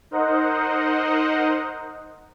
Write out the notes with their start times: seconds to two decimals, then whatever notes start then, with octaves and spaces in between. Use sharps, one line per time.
0.11 D#4 A#4 C5 D#5 F#5